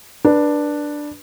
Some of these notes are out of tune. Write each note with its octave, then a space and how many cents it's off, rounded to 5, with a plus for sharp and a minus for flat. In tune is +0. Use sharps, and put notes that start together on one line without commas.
D4 +5 B4 -25